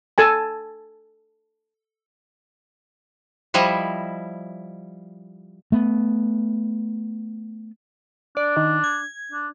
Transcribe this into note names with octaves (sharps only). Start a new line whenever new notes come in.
A4 G#5 A5
F3 G3 E4 D#5
A3 B3
D4 D5
D#3
G#6
D4